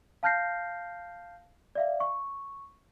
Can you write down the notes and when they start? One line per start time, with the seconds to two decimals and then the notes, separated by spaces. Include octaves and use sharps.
0.23 F5 A5 F6 G6 A#6 C7
1.75 D5 E5 F5
2.00 C#6